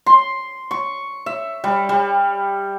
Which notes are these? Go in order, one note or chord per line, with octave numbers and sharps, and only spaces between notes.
C6
C#6
E5
G3
G3